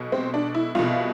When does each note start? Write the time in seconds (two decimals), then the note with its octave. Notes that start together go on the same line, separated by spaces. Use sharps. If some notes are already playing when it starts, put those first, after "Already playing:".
Already playing: B1 B2
0.12 C4
0.34 D4
0.55 E4
0.75 C2 B2 F4